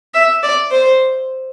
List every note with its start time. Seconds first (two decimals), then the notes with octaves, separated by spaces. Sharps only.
0.14 E5
0.43 D5
0.71 C5